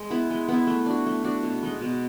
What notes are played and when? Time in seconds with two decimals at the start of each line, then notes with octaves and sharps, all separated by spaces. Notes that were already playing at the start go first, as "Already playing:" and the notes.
Already playing: G#3
0.10 B3 E4
0.30 G#3
0.48 B3 E4
0.67 A3
0.86 D4 F#4
1.06 A3
1.24 D4 F#4
1.43 B2
1.63 G#3 B3 D#4
1.81 B2